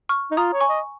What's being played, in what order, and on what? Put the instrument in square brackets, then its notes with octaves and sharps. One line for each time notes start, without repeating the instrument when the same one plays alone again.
[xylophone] C#6 F6
[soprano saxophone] D#4
[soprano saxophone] F4 [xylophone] A#5 D#6
[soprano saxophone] C#5
[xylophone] G#5 C#6
[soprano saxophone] D#5